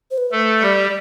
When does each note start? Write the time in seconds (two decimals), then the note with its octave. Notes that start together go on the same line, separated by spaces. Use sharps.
0.11 C5
0.18 B4
0.32 A3 A4
0.61 G3 G4 D5